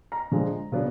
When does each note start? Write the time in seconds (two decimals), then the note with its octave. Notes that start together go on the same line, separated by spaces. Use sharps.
0.12 A#5
0.32 D3 F3 G#3
0.72 C#3 F#3 B3 D4